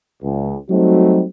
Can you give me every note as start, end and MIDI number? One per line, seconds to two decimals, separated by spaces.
0.23 0.55 37
0.70 1.24 54
0.70 1.24 55
0.70 1.24 57
0.70 1.24 60
0.70 1.24 63
0.70 1.24 66